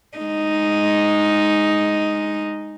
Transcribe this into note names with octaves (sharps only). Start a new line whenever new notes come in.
G#3 D#4